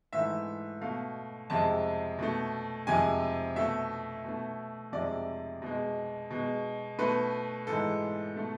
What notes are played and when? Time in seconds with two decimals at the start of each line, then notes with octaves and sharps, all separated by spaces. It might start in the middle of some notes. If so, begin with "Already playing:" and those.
0.13 G#2 E3 A3 E5
0.81 B2 A3 F5
1.50 F2 C3 G#3 A5
2.19 B2 A3
2.87 F2 C3 G#3 G#5
3.56 B2 A3 E5
4.24 B2 A3
4.92 F2 C3 G#3 D5
5.62 B2 G#3
6.30 B2 G#3
6.98 B2 A3 B4
7.67 G#2 E3 G#3 A4
8.36 B2 A3